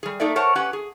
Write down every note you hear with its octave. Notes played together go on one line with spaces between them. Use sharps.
G3 G#4
A3 A#3 D#4 A4 D5 E5
A#4 C5 C#5 F#5 A5
C#4 G4 B4 F#5
G#4